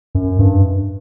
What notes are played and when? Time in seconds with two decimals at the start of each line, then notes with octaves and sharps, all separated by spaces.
0.15 F#2
0.39 G2